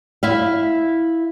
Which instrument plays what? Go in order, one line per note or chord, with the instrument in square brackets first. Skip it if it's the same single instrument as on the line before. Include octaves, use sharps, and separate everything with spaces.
[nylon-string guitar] E4 E5 F5